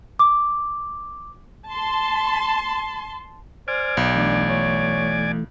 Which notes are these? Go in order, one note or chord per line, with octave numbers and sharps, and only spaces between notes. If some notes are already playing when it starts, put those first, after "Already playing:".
D6
A5 C6
C5 D5 G#5 F6
B1
E3 A3 D4
C#5